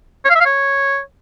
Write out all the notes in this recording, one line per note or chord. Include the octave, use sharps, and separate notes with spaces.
C#5
F5
E5
F5
C#5